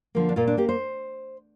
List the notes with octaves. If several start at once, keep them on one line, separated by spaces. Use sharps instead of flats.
D3 F3 A#3
D4
A#2 F4
D4
A#3 G4
C5